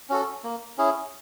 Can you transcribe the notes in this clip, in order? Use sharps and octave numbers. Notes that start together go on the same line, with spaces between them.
C#4 F#4 A4
A#3
C#4 E4 G#4